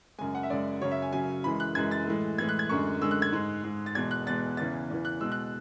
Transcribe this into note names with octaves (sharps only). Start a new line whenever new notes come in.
F#2 C#3 G#3 G#5
F#5
E5
F#2 C#3 G#3 D5
F#2 C#3 F#3 C#5
E5
G#5
F#2 C#3 F#3 G#5
F#2 E3 G#3 B5
F#6
F#2 E3 G#3 G#6
A6
A2 E3 G#3
A2 E3 G#3 G#6
F#6
G#6
F#2 D3 G#3 C#6
F#2 D3 G#3 E6
F#6
G#6
G#2 G#3
G#2 G#3
A6
E2 B2 G#3 G#6
F#6
E2 B2 G#3 A6
E2 C#3 E3 A6
E2 C#3 E3
F#6
B2 G#3 E6
F#6